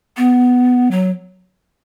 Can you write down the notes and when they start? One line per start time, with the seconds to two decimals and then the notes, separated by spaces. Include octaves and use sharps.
0.17 B3
0.91 F#3